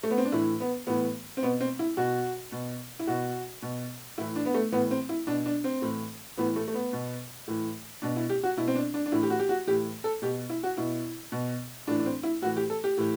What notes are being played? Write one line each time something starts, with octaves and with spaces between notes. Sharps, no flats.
A3
B3
C4
D4
A2 E3 E4
B3
A2 E3 B3
C4
B2 B3
C4
E4
B2 F#4
B2
E4
B2 F#4
B2
A2 E3 E4
D4
B3
A3
A2 E3 B3
C4
E4
B2 D4
D4
C4
A2 E3
A2 E3 B3
A3
A3
B3
B2
A2 E3
B2 D4
E4
G4
F#4
B2 E4
C4
D4
D4
D4
A2 E3 E4
G4
F#4
G4
F#4
A2 E3 G4
A4
B2 G4
E4
F#4
B2 E4
B2
A2 E3 D4
D4
C4
E4
A2 E3 F#4
G4
A4
G4
A2 E3